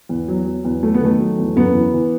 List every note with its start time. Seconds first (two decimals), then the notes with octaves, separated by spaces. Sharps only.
0.09 E2
0.28 F#3
0.47 F#3
0.64 E2
0.83 F#3 A3
0.94 B3
1.01 D#3 A3
1.20 F#3
1.38 E2
1.56 F#2 B3
1.74 E3
1.93 E3